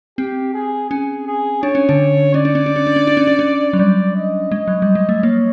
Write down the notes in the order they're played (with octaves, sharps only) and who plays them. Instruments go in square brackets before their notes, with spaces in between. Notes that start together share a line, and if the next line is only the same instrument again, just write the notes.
[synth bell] C4 [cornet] G4
[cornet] G#4
[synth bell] C#4 [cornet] G#4
[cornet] G#4
[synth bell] D4 [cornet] C#5
[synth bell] C#4
D3 D4
[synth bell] C#4 [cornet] D5
[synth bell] D4
C#4
D4
C#4
D4
C#4
D4
C#4
D4
C#4
F#3
[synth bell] G3 [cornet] D5
[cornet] D#5
[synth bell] G#3 [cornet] D#5
[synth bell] F#3
G3
G#3
A3
[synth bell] A#3 [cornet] C#5